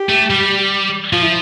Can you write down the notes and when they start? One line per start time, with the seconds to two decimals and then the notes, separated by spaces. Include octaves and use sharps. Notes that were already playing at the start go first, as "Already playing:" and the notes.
Already playing: G4
0.09 A3
0.30 G3
1.12 F3 F4
1.22 E4